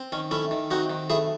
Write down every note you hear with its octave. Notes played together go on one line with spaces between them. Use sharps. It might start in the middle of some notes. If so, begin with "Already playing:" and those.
Already playing: C4
D#3 C#4
A3 C#4 E4
D#3
C4 D#4 F#4
D#3
A3 E4 G#4